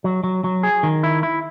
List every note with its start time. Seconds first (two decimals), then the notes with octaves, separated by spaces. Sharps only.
0.04 F#3
0.24 F#3
0.44 F#3
0.63 G#4
0.83 D#3
1.03 E4
1.23 E4